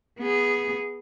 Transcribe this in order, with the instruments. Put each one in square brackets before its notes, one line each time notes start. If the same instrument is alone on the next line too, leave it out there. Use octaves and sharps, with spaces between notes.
[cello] B3 G#4